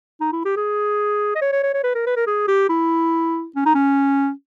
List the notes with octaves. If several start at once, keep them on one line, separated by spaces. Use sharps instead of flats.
D#4
E4
G4
G#4
D#5
C#5
C#5
C#5
C#5
B4
A#4
B4
A#4
G#4
G4
E4
C#4
D#4
C#4